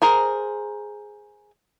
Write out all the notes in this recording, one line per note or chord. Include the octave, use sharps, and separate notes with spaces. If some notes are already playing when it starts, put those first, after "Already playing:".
G#4 A#4 C5